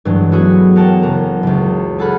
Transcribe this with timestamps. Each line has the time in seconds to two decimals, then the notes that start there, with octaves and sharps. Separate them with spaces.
0.05 G2 E3 F#3 G#3
0.32 A3 B3 E4 F#4 G#4
0.76 A#4 C#5 F#5 G5 A5
1.02 F#1 F#2 A#5
1.43 F#1 C#2
1.98 G#4 A4 F#5 B5 F6